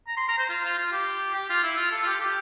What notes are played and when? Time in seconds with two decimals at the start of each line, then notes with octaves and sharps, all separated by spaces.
0.07 A#5
0.17 C6
0.28 A#5
0.39 C5
0.49 F4
0.64 F4
0.78 F4
0.92 G4
1.35 G4
1.49 F4
1.63 E4
1.77 F4
1.91 A4
2.03 F4
2.06 G4
2.20 G4